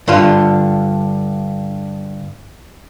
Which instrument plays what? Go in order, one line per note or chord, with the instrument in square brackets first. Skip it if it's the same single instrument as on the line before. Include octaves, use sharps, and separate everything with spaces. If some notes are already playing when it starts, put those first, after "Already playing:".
[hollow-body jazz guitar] G2 D3 F4